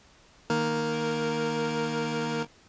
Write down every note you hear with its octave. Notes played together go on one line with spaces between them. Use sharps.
D#3 A#3 A#4